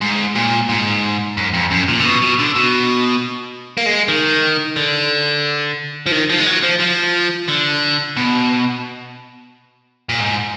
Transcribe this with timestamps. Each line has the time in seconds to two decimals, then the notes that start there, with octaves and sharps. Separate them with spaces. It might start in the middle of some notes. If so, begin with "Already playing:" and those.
0.01 G#2
0.35 A#2
0.69 G#2
1.37 F#2
1.54 F2
1.71 F#2
1.88 A#2
2.00 D3
2.05 B2
2.22 B2
2.39 D3
2.55 B2
3.77 A#3
3.86 G#3
4.08 D#3
4.76 D3
6.06 F3
6.12 D#3
6.30 F3
6.38 G#3
6.47 F#3
6.63 F3
6.80 F3
7.48 D3
8.16 B2
10.09 A#2
10.20 G#2